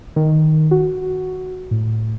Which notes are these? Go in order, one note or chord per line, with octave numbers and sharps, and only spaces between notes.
D#3
F#4
A2